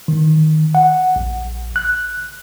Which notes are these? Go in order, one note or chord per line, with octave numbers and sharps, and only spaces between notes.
D#3
F#5
A#1
F#6